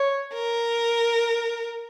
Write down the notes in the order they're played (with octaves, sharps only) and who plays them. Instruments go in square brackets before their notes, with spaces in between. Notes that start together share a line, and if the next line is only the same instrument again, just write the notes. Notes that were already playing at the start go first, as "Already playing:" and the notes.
Already playing: [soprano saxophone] C#5
[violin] A#4